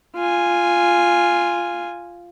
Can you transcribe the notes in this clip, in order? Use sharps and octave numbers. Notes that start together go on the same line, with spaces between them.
F4 G#5